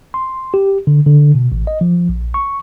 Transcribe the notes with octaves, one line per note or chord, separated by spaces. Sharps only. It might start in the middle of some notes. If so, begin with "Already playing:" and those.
C6
G4
D3
D3
B2
A1
D#5
F3
A#1
C#6